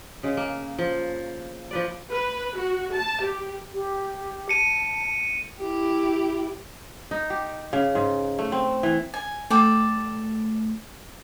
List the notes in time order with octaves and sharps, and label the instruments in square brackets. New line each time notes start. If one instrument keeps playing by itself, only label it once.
[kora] C#3 G#3
A#3
F3
F3 B4 D5
[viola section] B4
F#4
A5
G4
[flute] G4
[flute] A5 [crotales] C#7 D#7
[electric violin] E4 G4
[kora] D#4
G4
C#3
G#2
A3
C4
E3
[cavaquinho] G#5
[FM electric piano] A3 [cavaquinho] A4 D5 G5